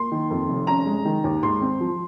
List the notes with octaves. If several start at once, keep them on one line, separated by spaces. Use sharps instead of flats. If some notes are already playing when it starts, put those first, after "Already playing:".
Already playing: A#3 C6
D#3
F2
F1
C#4 A#5
G#3
D#3
D#2
G#2 C6
C4
F3